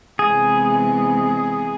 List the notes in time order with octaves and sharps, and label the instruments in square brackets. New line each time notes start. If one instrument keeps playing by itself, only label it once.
[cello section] C3 E3 G#3 B3 [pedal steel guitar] G#4